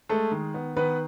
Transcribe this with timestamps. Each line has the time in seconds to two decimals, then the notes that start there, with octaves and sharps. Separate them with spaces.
0.09 G#3 A3 A4
0.31 D#3
0.54 B3
0.77 D#3 B3 B4